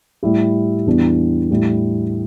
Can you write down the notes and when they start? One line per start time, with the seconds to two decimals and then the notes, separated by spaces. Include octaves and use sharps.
0.23 A2 G3 E4 G4
0.86 E2 E3 G3 B3 D4
1.50 A2 G3 E4